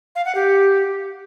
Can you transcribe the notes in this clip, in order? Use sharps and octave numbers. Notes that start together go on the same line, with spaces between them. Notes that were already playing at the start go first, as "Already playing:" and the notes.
F5
F#5
G4